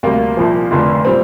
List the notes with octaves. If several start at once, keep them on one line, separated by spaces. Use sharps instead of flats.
D2 C3 G3 A#3
C2 A#2 F3
F1 F2 D3
A#2 G3 C4